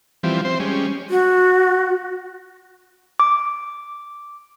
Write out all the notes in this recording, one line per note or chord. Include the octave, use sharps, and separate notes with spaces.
E3 F3 G3 C4
C4 C5
G3 G#3 C#4
F#4
D6